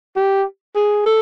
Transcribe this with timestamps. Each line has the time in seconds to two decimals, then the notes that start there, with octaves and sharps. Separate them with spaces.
0.16 G4
0.76 G#4
1.06 A4